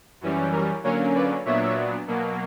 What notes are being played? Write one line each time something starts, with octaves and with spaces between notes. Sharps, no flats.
F#2 E3 G3 C#4
A#4
D3 F#3 A#3 C#4 A#4 C#5
B4 D5
A#2 F#3 B3 D4 C#5 E5
B2 F#3 A#3